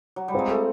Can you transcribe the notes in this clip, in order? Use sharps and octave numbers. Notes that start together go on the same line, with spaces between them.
F#3
G3
G#3 C4 F4 G#4
A3